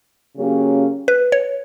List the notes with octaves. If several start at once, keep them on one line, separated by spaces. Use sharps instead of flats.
C#3 F#3 A#3 C#4 G4
B4
C#5